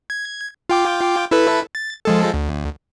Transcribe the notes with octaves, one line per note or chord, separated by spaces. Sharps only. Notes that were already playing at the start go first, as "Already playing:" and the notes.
G#6
F4 G5 D6
E4 A4 B4
A6
F3 G#3 A4
D2